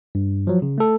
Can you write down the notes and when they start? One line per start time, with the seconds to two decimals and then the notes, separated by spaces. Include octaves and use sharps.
0.15 G2
0.47 F3 F#3
0.62 C#3
0.78 A3 A4